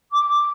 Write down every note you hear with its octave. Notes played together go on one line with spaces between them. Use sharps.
D6